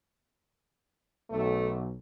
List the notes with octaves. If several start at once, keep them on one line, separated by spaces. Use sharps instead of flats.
B1 A3